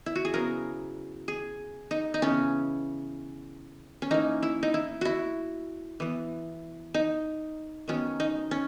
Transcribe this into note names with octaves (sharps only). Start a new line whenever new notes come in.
E4
F#4
G#4
C#3 F#3 B3 A#4
G#4
D#4
D#4
C#3 E3 B3 C#4
C#4
E3 A#3 D#4
E4
D#4
E4
E4 F#4
E3 B3
D#4
D#3 F#3 B3 C#4
D#4
C#4